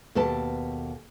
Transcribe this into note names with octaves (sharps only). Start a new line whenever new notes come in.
D#2 B2 A4 B4 A5